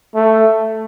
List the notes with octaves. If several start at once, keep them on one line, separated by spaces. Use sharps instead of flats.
A3